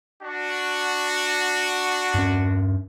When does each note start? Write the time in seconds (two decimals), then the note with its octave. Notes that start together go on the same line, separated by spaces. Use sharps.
0.23 D4 F#4
2.15 G2 C#4